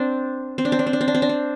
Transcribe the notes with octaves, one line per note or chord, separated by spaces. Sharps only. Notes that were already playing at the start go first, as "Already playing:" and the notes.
Already playing: C4 D4
C4
D4
C4
D4
C4
D4
C4
D4
C4
D4
C4